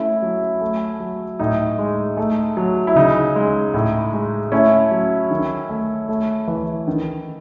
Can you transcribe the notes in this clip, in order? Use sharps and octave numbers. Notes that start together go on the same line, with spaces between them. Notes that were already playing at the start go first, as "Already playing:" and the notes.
Already playing: A3 C#4 E4
F#3
A3
F#3
A2 D#4
G#3
A3
F#3
E4
C#3 D#4
G#3
A2
G#3
A3 C#4 E4
F#3
D#3
A3
A3
E3
D#3